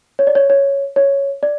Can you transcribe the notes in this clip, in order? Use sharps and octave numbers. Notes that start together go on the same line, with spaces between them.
C#5
D5
C#5
C#5
C#5
D5